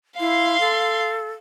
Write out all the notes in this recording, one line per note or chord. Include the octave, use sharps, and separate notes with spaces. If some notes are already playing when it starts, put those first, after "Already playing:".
E4 F5 C6
A4